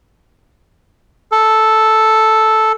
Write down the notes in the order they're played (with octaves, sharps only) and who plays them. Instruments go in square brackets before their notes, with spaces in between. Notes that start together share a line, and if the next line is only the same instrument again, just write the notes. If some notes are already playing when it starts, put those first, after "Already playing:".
[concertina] A4